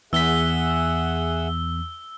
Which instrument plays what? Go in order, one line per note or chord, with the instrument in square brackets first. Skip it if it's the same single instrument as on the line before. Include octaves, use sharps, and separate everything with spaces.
[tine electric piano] E2 B6 [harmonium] G#4 E5 F#5 [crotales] E6 G7